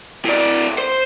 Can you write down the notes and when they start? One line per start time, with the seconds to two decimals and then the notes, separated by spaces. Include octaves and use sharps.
0.25 A2 D5
0.78 C5